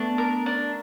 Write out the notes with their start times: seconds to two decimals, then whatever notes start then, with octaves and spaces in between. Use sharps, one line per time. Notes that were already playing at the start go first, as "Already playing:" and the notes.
Already playing: A3 B3 D4
0.18 A#4
0.46 D4